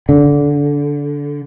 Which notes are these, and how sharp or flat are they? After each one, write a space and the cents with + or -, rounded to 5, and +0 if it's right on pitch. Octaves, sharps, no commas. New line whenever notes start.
D3 -20